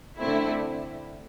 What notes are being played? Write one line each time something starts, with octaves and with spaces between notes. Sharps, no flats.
D3 A3 C4 E4